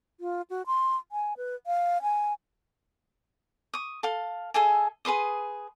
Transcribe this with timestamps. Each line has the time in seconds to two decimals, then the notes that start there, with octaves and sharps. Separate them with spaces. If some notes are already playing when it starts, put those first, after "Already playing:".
0.20 F4
0.50 F#4
0.66 C6
1.12 G#5
1.37 B4
1.67 F5
2.02 G#5
3.74 C#6 D#6
4.03 A4 F5
4.54 G#4 A4 E5 G#5
5.05 G#4 B4 C6 D#6